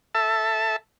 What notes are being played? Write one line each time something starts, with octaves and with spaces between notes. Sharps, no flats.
A4 E5 A5